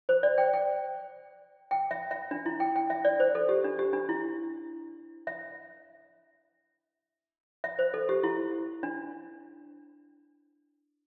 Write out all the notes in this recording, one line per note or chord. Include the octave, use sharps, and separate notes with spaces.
C5
D5
G5
G5
G5
E5
E5
D4
E4
G5
G5
E5
D5
C5
A4
G4
D4
G4
D4
E4
E5
E5
C5
A4
G4
E4
D4